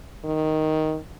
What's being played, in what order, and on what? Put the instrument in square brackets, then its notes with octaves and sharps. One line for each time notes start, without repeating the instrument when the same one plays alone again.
[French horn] D#3